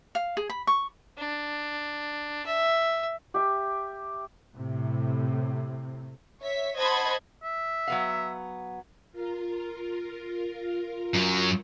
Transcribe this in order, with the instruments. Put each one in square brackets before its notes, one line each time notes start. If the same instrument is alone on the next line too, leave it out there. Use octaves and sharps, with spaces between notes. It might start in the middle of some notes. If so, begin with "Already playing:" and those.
[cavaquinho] F5
G#4
B5
C#6
[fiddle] D4
E5
[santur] G4 E5
[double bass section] A2 C3
[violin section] C#5 E5 B6
C5 D#5 F#5 A5 B5 G#6
[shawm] E5
[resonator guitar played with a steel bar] F#3 B3 F5
[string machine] F4 A#4
[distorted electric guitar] F#2 F#3